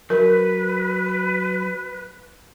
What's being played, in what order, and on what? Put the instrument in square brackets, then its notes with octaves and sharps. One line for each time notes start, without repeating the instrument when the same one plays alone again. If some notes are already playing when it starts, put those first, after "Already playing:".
[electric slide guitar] F#3 [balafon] A#4 [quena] B4